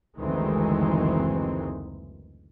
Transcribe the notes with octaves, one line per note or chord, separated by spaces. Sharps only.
F#1 D2 D#3 E3 G#3 C4